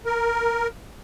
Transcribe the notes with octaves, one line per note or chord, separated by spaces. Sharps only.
A#4